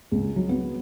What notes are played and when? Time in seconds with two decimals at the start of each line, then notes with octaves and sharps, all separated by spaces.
0.12 C#2
0.36 F#3
0.49 B3